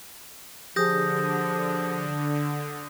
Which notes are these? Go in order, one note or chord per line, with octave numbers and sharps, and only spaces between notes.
D3 F3 G4 G#4 D#6 G6 A#6